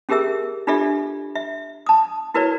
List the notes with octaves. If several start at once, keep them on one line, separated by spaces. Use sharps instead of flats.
C#4 G4 G#4 A#4 E5 E6
D4 F4 G4 A4 D5 E5
E5
A5 D#6
E4 F#4 A#4 B4 C#5 D5